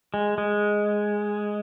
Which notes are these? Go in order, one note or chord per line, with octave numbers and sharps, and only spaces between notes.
G#3
G#3